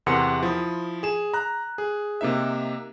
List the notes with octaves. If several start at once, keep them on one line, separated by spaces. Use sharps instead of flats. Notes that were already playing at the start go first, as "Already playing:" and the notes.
E2 C3 A#4 F#5 C6 C#7
F3 E4 D#6
G#4 E7
A#5 F#6
G#4
C3 A#3 D#4 E5